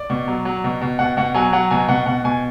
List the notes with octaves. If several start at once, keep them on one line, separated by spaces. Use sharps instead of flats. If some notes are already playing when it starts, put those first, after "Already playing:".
Already playing: D5
B2
F#3
F#3
B2
B2
B2 F#5
B2 F#5
F#3 G#5
F#3 F#5
B2 G#5
B2 F#5
B2 F#5
B2 G#5